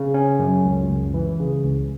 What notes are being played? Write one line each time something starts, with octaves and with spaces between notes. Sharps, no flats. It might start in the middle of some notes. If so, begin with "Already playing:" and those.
Already playing: C#3
C#4
F#2
C#2
C#2
E3
C#3
C#2